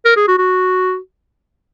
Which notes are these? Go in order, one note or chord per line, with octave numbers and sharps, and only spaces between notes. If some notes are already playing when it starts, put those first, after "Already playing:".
A#4
G#4
F#4
F#4